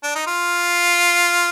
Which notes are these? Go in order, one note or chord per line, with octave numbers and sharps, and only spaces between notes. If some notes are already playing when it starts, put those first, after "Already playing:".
D4
D#4
F4